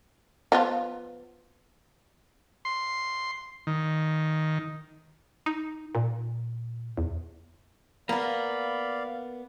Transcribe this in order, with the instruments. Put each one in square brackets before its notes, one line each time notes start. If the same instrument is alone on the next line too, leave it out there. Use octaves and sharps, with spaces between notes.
[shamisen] F3 B3 F4
[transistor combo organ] C6
D#3
[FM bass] D#4
A#2
E2
[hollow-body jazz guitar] A#3 B3 [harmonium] D5 F5 [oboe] B5